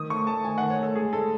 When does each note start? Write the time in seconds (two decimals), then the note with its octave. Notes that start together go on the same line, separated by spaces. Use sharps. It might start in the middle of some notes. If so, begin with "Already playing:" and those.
Already playing: D#3 D#6
0.10 A3 C#6
0.27 A3 A5
0.45 D#3 G#5
0.58 D#3 F#5
0.70 C#5
0.79 A3 A4
0.95 G#3 G#4
1.13 G#3 A4